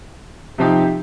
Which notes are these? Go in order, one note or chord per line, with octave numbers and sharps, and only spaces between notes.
C3 F3 C4 D#4 G4